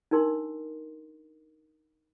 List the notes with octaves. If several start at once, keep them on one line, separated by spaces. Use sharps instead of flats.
D4 D#4 A#4 C6